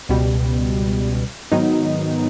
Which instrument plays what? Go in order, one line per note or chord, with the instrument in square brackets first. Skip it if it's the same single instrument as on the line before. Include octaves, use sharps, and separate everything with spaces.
[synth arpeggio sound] C#2 B2 G3
G#2 D#3 F#3 B3 D#4